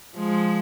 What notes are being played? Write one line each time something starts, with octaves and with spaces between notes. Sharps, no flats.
F3 G#3